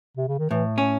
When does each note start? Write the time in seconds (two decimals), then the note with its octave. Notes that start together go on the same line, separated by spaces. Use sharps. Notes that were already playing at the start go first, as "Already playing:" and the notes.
0.17 C3
0.28 C#3
0.38 D#3
0.50 A2 E3
0.78 C#4